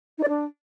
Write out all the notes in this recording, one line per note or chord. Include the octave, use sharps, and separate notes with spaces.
D#4
D5
D4